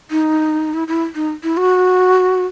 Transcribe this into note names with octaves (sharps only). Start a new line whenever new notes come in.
D#4
E4
E4
D#4
E4
F#4